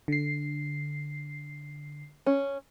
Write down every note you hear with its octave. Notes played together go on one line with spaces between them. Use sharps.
D3 C7
C#4